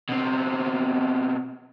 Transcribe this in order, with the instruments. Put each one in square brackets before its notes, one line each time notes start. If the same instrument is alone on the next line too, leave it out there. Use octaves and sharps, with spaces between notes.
[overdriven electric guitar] B2 C4